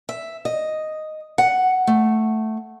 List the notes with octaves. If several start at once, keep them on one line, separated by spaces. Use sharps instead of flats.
E5
D#5
F#5
A3